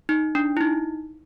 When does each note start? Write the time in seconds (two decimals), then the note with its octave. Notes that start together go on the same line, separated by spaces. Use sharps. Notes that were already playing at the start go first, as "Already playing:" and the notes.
0.09 D#4
0.35 D4
0.57 E4
0.61 D#4